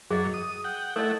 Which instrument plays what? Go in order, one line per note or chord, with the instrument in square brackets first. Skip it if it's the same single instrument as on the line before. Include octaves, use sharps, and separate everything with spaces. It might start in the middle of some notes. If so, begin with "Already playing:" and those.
[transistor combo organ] F#2 F#3 [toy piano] G#4 D#5
[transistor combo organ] D#6
F#5 G5
[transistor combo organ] A3 E4 F#5 [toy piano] A4 D#5